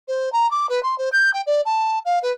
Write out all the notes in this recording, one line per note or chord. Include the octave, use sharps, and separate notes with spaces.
C5
A#5
D6
B4
C6
C5
G6
G5
D5
A5
F5
B4